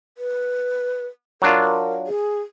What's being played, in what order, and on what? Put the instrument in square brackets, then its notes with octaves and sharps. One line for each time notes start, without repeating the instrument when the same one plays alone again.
[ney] B4
[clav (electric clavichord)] F#3 D4 F4 [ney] A#4
[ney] G#4